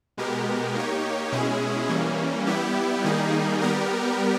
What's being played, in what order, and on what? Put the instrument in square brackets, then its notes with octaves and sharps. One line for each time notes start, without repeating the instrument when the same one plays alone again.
[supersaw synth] B2 G#3 B3 G4 A#4
A#3 D#4 G4 C#5
B2 G#3 C#4 E4 G#4
E3 G3 A#3 C#4
G3 B3 E4 G4
D#3 G3 A#3 D#4 G#4
G3 B3 G4 A#4